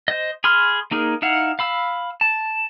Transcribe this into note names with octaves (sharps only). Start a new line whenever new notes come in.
C5 D#5
G#4 B5 C6 F6
A#3 D#4 G#4 A#4
D#4 E4 F5 F#5
F5 B5 E6
A5